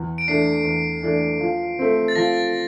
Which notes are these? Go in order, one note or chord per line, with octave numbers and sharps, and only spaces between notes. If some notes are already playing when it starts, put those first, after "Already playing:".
Already playing: E2
D7
E3 A3 D4 C7
E2
E3 A3 D4
F3
A3 C4
A6
F3 A#6